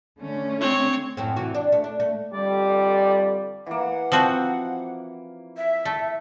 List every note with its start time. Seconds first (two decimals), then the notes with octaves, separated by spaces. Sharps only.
0.19 D3 A3 C#4
0.61 C4 C#5
1.17 F#2 A2 C4
1.36 C3 E3 F#4
1.55 D4
1.72 A3
1.84 D4
2.00 A3
2.33 F2 D3 G3 D5
3.66 E3 A#3 F#5
4.12 F3 C4 F#4
5.58 E5
5.85 A3